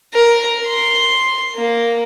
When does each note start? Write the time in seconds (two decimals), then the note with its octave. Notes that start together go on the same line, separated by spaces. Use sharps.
0.14 A#4
0.66 C6
1.55 A#3